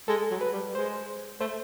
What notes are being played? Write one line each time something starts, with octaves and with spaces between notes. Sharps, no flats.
G#3 A4
F#3
B4
G3
G#3 C5
A3 C5